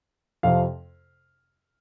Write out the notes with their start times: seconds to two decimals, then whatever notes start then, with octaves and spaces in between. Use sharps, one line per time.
0.43 F2 C3 F3 F5